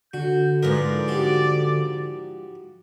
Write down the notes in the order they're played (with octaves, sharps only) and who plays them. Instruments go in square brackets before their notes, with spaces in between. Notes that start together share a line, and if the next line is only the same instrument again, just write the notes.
[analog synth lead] D3 [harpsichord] F#4 [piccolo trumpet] G6
[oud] G#2 F3 [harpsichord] A#4 B4 [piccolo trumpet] D5
[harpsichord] F#4 G4